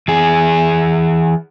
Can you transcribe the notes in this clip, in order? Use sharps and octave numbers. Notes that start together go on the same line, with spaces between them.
E3 G#4